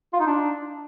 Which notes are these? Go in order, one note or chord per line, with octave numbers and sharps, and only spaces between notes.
F4
D#4
D4